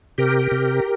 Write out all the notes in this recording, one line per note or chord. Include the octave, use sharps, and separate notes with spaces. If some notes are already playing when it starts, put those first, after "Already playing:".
C3 G4 A#4
C3